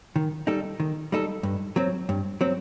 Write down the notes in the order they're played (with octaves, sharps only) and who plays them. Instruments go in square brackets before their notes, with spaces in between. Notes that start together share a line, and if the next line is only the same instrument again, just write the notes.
[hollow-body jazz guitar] D#3
G3 D#4 A4
D#3
G3 D#4 A4
G2
F#3 C4
G2
F#3 C4